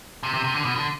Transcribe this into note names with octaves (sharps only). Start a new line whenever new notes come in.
C3
C3
C3
D3
B2
D3